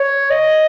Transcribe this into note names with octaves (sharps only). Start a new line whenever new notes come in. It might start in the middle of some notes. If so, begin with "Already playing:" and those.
Already playing: C#5
D#5